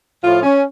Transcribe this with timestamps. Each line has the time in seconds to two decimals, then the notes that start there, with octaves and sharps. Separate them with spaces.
0.23 A2 F3 F4
0.43 C#4